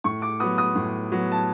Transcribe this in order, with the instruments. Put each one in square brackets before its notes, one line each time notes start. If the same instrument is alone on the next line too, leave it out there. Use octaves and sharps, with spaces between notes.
[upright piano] A2 C#6
D6
F#3 B3 D#6
D#6
A2
F#3 B3
A5